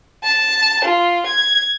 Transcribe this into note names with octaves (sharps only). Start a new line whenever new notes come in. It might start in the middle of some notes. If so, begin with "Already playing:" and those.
A5
F4
G#6